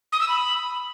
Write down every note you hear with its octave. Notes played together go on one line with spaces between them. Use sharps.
D#6
E6
B5